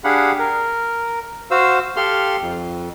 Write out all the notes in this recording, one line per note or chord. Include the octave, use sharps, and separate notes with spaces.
D4 G4 G#4 F5 F#5 B5
A#4
F#4 C5 F5 E6
G4 A4 F5 C6 F6
F2